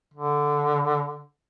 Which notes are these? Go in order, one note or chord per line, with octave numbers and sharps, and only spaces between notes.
D3